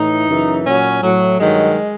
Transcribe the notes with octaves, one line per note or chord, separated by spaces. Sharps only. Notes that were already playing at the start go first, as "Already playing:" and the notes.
Already playing: A2 E3 D#4
F#2 C#3 E3
A#2 F#3 C#4
A2 F#3
G2 D#3 F#3 G#3